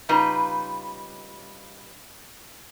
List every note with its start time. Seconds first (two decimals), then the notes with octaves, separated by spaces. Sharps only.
0.09 C#3 G3 D#4 F4 B4 A#5